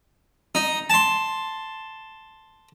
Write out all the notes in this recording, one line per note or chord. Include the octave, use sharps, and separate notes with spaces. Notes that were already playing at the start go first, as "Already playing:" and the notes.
D#4
A5 C6